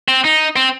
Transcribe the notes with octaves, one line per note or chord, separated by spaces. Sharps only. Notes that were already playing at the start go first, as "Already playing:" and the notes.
C4
D#4
C4